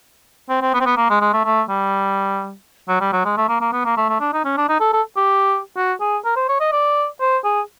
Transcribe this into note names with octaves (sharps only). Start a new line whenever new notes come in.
C4
C4
B3
C4
B3
A#3
G#3
G#3
A3
A3
G3
F#3
G3
F#3
G#3
A3
A#3
A#3
B3
A#3
A3
A3
D4
D#4
C#4
D4
D#4
A4
A4
G4
F#4
G#4
A#4
C5
C#5
D#5
D5
C5
G#4